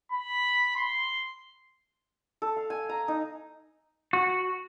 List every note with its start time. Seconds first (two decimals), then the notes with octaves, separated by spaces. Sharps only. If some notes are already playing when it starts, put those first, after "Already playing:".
0.12 B5
0.76 C6
2.42 A4
2.56 F5
2.70 G#5
2.89 A#5
3.08 D#4
4.13 F#4